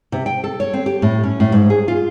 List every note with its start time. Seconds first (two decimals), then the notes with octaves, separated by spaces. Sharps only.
0.12 C3
0.26 G5
0.44 A4
0.60 C#5
0.73 C4
0.86 G4
1.02 A2
1.23 C#4
1.40 A2
1.52 G#2
1.70 G#4
1.88 F4